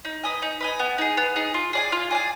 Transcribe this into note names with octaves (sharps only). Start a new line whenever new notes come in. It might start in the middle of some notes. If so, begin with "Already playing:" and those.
D#4
B4 D#5 G#5
D#4
B4 D#5 G#5
B3
D#4 G#4
B3
D#4 G#4
F4
G#4 D5 G#5
F4
G#4 D5 G#5